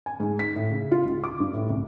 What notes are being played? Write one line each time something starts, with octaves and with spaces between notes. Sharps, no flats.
G#5
G#2
B6
A2
C#3
F4
C#2
D6
G2
A2
C2